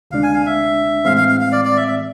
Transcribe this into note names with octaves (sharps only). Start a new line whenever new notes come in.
D2 C3 G#3 D4 F5
G#5
F5
E5
A2 E3 G#3 C4 F5
F5
F5
F5
D5
D5
E5
E5